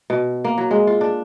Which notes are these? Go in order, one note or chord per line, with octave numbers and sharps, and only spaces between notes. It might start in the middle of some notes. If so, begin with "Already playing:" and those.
B2
A#3
F#3
G#3
F4
D4